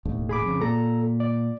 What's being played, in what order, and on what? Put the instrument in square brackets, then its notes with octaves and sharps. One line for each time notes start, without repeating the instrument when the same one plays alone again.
[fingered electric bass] E1 D#2 A2
[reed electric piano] G#4 B5 D6
[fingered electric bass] F2 C#3
[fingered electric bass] A#2 [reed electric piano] A4 A#5
[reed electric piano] D5